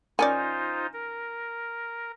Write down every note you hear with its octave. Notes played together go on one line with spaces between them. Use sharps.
D#3 C#4 D#4 F4 C5 D5 G#5
A#4